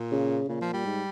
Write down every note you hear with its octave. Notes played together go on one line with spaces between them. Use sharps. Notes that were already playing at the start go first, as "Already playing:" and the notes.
Already playing: A#2
C#3
A#2 C#3
F3
G3
G#2